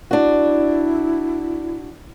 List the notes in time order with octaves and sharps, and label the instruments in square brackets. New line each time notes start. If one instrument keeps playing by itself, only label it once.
[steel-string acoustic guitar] D4 F#4 [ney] E4